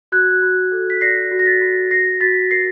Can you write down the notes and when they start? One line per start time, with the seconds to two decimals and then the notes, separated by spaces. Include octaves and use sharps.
0.12 F#4 F#6 G#6
0.42 F#4
0.72 A4
0.90 B6
1.01 D5 A#6 C7
1.31 F#4
1.39 A#6
1.46 A6 B6
1.61 F#4
1.91 F#4 A#6 C7
2.21 F#4 A6 B6
2.50 A#4 A#6 C7